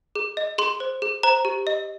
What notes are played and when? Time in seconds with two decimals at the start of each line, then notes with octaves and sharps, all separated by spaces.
0.15 G#4
0.37 D#5
0.58 G#4 C6
0.80 C5
1.02 G#4
1.23 C5 A#5
1.45 G4
1.67 D#5